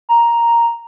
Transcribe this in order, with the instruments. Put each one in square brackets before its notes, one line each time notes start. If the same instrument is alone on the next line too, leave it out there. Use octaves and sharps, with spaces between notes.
[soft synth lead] A#5